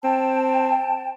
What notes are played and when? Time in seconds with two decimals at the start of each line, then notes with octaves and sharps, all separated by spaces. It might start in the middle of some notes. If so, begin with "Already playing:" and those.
0.04 C4 G5 A5